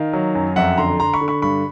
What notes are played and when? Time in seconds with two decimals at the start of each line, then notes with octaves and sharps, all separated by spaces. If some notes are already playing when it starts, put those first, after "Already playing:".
Already playing: D#3 D#5 F5
0.13 F#3
0.35 F#2
0.56 F2 E5 F#5
0.78 D3 A#5 C6
1.00 D3 A#5 C6
1.13 B5 C#6
1.21 D3
1.28 B5 C#6
1.42 G2 B5 C#6